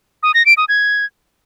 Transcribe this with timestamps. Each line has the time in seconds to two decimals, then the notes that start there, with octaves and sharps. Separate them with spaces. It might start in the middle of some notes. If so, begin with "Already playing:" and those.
0.23 D#6
0.34 A#6
0.46 D7
0.57 D#6
0.69 G#6